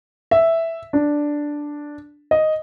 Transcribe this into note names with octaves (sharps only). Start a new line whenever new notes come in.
E5
D4
D#5